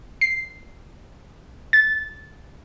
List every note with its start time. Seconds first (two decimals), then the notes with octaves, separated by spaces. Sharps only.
0.21 C7
1.73 A6